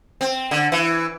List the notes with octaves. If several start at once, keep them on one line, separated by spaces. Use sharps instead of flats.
C4
D3
E3